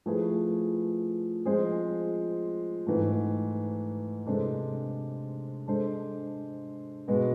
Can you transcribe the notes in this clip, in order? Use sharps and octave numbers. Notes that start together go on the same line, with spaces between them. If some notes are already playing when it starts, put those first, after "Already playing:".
F3 A3 E4 G#4 B4
F3 G#3 C4 G#4 C5
G#2 E3 A3
C3 G#3 D4 A4 C5
G#3 D4 A4 C5
B2 G#3 B3